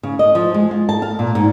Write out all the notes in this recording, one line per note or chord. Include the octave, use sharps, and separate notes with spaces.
C#3
D#5
F3
G#3
F4
A5
F5
A#2
G#2